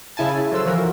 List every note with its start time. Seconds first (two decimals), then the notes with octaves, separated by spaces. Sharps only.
0.17 C#3 E4 G#5 A5
0.52 F#3 A4 C5 E6
0.66 E3 F3 F#4 A#4